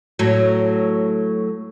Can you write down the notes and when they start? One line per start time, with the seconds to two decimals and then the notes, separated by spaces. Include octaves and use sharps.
0.19 A2 F#3